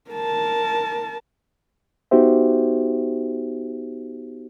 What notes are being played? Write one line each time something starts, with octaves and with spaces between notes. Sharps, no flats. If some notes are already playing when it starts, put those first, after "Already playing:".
A#4 A5
B3 D#4 F#4 G4 C5 E5